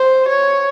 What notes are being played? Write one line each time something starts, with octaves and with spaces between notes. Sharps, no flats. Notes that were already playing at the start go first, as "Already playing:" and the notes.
Already playing: C5
C#5